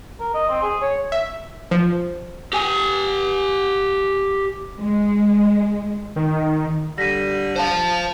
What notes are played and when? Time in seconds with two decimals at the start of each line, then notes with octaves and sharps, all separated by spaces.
0.20 A#4
0.34 D#5
0.49 C4
0.62 G#4
0.81 C#5
1.12 E5
1.71 F3
2.53 G4 G#5
4.80 G#3
6.16 D#3
6.98 D3 G3 A#6 B6 D#7
7.56 C5 F5 A5